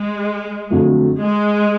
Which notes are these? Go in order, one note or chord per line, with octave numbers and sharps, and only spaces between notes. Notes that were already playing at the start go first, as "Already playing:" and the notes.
Already playing: G#3
F2 D3 F#3 A3
G#3